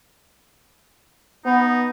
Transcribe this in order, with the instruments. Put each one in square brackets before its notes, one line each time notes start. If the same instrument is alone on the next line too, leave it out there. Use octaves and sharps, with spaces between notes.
[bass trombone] B3 [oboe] D#4